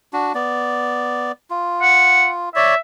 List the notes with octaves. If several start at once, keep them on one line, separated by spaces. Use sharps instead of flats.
D4 F#4
B3 D5
F4
F#5
C#5 D5 E5